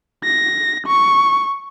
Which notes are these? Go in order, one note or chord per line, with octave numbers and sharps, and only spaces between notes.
A#6
C#6